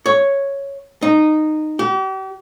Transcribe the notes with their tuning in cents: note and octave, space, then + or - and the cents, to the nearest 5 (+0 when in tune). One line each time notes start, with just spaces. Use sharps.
C#5 +0
D#4 -15
G4 -40